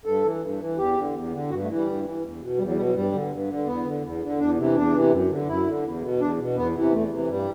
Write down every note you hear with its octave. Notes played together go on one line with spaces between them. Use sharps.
G2 A4
E3
G2
E3
E2 G4
D3
E2
D3
G2 F#4
A3
E3
G3
G2
E3
E2
B2
E2 G3
F#3
B2 G3
F#3
G2 G3
D3
G2
D3
E2 B3
D3
E2
D3
E2 D4
C3 E3
E2 D4
C3 E3
F#2
D3
F#2 E4
D3
E2
B2
E2 D4
B2
E2 B3
C3 E3
E2 A3
C3 E3
G2 G3